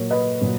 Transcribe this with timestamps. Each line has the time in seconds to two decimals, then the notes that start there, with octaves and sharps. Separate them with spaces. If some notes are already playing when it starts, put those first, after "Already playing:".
Already playing: A#2 F#3 A#4 C#5
0.11 B4 D#5
0.41 A#2 F#3